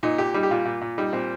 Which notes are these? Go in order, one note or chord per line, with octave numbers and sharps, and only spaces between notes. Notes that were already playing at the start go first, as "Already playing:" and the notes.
A#2 D#4
A#2 G4
G3 D#4
G4
A#2 F4
A#2
A#2
G3 D#4
A#2 C4